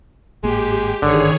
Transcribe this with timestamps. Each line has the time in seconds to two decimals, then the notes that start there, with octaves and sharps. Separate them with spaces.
0.43 G#1 A2 G#3 A#3 G4
1.02 G1 G#2 D3 D#3 G#4 C#5